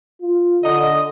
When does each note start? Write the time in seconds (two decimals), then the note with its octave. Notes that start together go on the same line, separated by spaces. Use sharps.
0.21 F4
0.64 D3 D#5